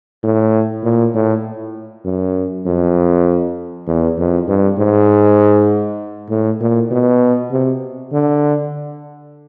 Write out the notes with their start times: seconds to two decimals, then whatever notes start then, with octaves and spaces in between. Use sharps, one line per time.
0.23 A2
0.84 A#2
1.15 A2
2.05 F#2
2.66 F2
3.87 E2
4.18 F2
4.48 G2
4.78 G#2
6.30 A2
6.61 A#2
6.91 B2
7.51 C3
8.13 D3